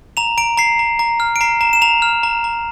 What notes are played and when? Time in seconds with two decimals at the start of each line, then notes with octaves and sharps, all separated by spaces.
0.17 A#5 F7
0.38 A#5 D7
0.57 A#5 C7
0.79 A#5
0.99 A#5
1.20 F6
1.36 D7
1.41 A#5 C7
1.61 A#5 E7
1.73 E7
1.82 A#5 F7
2.02 F6
2.23 A#5
2.44 A#5